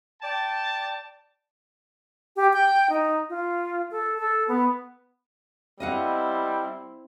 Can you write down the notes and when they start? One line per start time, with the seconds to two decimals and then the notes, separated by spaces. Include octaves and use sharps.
0.21 D5 G5 A5
2.36 G4
2.53 G5
2.89 D#4
3.29 F4
3.91 A4
4.17 A4
4.48 B3
5.80 G3 C4 E4 D#5 F5 F#5